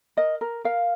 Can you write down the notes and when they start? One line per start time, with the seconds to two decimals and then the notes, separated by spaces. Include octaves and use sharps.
0.17 A#4 D#5
0.41 A#4
0.65 A#4 F5